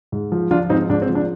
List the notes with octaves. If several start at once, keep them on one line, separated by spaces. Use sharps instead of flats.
G#2
F3
F3 D4 F4
G#2 C4 D#4
G#2 D4
C4
F3
D4